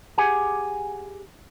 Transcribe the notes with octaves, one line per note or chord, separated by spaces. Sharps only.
G4 G#4 F#5 G#5